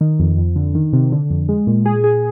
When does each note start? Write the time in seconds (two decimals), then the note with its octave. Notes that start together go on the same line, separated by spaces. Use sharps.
0.01 D#3
0.19 F2
0.37 F2
0.56 D3
0.75 D#3
0.93 C3
1.12 D3
1.30 F2
1.49 G#3
1.67 A#2
1.86 G#4
2.04 G#4